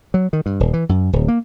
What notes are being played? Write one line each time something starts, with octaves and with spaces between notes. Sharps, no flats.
F#3
D#3
G2
D#1
E3
F#2
D1
A#3